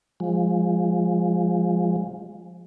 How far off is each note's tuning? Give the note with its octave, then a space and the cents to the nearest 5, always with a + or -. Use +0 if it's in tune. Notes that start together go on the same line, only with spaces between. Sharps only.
F3 +10 G#3 -10